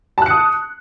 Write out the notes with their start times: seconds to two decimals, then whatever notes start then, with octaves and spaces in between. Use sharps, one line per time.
0.18 A5
0.22 F#6
0.26 C#7
0.30 D#6